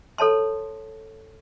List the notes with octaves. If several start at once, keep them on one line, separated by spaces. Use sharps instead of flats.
A4 C#5 A5 C6